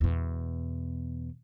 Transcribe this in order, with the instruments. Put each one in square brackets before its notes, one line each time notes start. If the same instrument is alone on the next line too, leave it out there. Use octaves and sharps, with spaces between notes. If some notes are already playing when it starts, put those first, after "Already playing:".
[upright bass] E2 B2